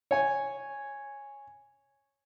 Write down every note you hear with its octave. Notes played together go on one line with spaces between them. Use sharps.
C#5 G#5